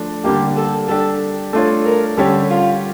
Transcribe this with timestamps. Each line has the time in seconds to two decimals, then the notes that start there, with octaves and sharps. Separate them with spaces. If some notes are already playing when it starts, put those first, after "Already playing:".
Already playing: F3 A3 D4
0.24 D3 G3 A#3 D4 G4
0.57 A4
0.88 G3 D4 G4 A4
1.53 A3 D4 F4 A4 C#5
1.85 A#4
2.17 D3 G3 C#4 G4 A4
2.50 F4